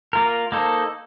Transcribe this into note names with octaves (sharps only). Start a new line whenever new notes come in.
A#3 F4 A#4
A#3 D#4 A4 C5